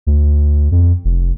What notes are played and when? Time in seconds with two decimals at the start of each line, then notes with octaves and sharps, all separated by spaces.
0.07 D2
0.71 F2
1.05 F1